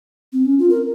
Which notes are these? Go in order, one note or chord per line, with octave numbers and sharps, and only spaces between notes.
C4
C#4
F4
A#4